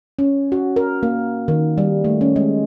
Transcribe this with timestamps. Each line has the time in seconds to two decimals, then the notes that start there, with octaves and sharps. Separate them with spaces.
0.19 C#4
0.52 F#4
0.76 A#4
1.03 A#3
1.48 D#3
1.78 G3
2.04 A3
2.21 C#4
2.36 G#3